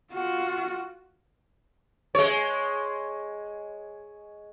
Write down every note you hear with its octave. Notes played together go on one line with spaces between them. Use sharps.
F4 F#4
G#3 C#5